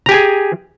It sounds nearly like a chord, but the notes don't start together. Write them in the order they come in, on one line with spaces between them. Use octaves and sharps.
A#5 G4 G#5 G#4